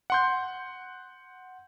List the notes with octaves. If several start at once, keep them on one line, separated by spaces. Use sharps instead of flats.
F#5 C6 G6